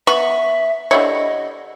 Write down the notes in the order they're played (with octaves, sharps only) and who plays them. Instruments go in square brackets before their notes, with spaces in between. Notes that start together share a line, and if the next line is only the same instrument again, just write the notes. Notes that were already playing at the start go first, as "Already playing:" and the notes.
[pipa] B3 B5 C#6 [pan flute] E5
[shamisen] D3 G3 E4 [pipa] C#5 [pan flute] D#5